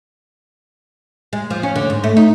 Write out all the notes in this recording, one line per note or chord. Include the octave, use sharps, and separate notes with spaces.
G#3
F3
C#4
D3
G#2
A3
D#4